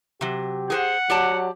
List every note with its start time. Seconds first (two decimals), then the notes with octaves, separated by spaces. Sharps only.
0.21 C3 F#3 G4
0.70 G#4 A#4 C5 F#5
1.10 F#3 G4 D5 A5